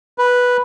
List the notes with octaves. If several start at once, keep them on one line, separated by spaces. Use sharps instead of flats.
B4